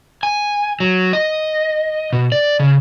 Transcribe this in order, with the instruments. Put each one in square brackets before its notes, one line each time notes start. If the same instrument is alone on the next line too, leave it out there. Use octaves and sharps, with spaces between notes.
[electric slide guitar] G#5
F#3
D#5
B2
D5
C#3